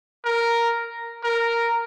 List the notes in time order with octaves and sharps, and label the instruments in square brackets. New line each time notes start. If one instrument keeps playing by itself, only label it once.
[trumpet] A#4
A#4